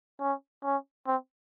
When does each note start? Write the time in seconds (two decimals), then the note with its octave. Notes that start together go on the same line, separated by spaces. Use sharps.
0.20 C#4
0.64 C#4
1.07 C4